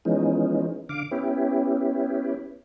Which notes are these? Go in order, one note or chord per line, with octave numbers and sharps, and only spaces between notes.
E3 F3 G#3 B3 C#4 D#4
D3 F5 D6
B3 C#4 E4 G4